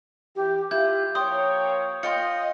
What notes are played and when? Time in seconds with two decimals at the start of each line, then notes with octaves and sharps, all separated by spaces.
0.36 E3 G4
0.71 E4 F4 G4 G6
1.15 F3 A#3 C#5 G5 C6 D#6
2.03 F4 D#5 G5 C6 C#7